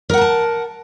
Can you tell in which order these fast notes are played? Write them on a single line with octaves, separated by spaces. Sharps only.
A#4 F#5 A#5 A5